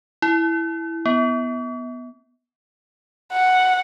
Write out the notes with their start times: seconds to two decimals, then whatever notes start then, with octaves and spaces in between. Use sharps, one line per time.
0.22 E4
1.06 B3
3.32 F#5